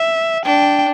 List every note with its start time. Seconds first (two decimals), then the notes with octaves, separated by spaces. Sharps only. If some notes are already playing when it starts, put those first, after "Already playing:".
Already playing: E5
0.45 D4 G5